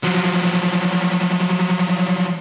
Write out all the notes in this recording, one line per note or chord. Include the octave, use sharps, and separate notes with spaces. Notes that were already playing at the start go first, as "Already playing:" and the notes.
F3 F#3